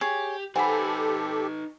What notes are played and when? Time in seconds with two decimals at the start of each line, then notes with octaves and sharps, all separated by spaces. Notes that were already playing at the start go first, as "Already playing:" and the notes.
0.01 G4 G#4 C#5
0.56 D#4 G4 A4 B4 C5 F#5 G#5 B5